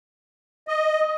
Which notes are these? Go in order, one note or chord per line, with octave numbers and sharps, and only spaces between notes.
D#5